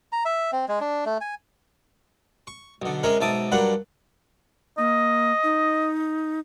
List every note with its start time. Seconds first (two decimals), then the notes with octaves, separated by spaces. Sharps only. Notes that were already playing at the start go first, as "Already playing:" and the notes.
0.12 A#5
0.25 E5
0.53 C4
0.68 G#3
0.81 D4
1.06 A3
1.21 G#5
2.47 C#6
2.82 B1 D3
3.03 C3 G#3 C#4 G#4 A#4
3.21 B1 G#2 E5 A5 D6 D#6
3.52 G2 F#3 A#3 D4 F#5 B5
4.78 A#3 D#5
5.43 D#4